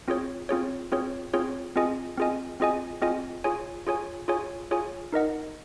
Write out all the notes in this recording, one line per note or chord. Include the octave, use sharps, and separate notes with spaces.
C4 F4 G#4 C#5
C4 F4 G#4 C#5
C4 F4 G#4 C#5
C4 F4 G#4 C#5
C4 F4 G#4 D#5 G#5
C4 F4 G#4 D#5 G#5
C4 F4 G#4 D#5 G#5
C4 F4 G#4 D#5 G#5
F4 G#4 C#5 G#5
F4 G#4 C#5 G#5
F4 G#4 C#5 G#5
F4 G#4 C#5 G#5
D#4 A#4 D#5 F#5